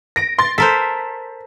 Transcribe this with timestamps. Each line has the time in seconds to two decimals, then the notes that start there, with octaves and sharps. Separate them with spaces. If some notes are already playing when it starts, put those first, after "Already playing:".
0.16 A#6 D7
0.39 C6 A6
0.58 A4 A#4 C5 B6